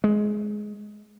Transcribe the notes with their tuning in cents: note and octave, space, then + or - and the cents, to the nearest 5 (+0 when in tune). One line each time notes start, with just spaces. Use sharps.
G#3 +15